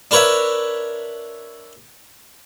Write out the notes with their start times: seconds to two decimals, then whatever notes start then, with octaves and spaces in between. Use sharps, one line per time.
0.11 D4 A#4 B4 C#5 E5